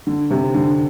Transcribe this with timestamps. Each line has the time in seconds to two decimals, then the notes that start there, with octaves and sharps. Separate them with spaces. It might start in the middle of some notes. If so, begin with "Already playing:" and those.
0.07 D3
0.30 C3
0.54 D3